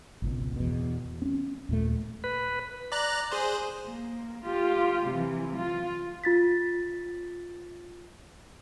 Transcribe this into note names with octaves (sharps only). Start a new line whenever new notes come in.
G#1 C#2 B2
E2 B2
C4 C#4
D#2 A#2 A3
B4
D5 A#5 F#6
G#4 C5
A#3
F4 G4
C3 E3
F4
F4 A6 B6